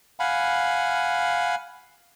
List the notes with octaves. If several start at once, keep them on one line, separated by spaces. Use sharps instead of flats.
F5 F#5 G#5 B5